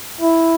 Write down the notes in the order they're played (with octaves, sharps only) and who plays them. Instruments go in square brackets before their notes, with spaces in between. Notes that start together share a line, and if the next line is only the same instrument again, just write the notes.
[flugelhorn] E4